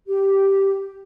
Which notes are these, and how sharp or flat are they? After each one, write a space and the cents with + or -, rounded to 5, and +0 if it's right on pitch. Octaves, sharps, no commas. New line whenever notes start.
G4 -5